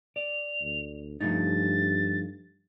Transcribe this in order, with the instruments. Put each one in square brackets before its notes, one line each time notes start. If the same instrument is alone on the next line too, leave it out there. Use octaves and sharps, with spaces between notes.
[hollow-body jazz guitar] D5 [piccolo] F7
[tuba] D2
[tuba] G2 [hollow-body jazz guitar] F3 A3 D#4 [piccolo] A6